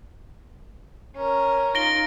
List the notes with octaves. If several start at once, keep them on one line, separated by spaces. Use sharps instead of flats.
C#4 A#4
D#4 F4 A#6 D7 G7